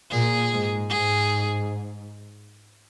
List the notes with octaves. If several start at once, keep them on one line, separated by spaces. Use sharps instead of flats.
A#2 G#4
G#2
G#2 G#4